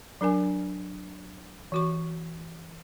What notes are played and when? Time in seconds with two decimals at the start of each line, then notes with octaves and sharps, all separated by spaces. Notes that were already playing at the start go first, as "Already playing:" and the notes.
0.21 F#3 D4 A#4 G#5
1.72 E3 F#4 C#6